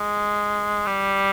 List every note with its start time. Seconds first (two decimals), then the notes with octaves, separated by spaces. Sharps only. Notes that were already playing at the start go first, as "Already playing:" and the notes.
Already playing: G#3
0.87 G3